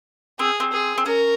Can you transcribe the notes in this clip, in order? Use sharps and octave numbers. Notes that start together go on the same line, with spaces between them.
C4 G#4
C4
G#4
C4
C#4 A#4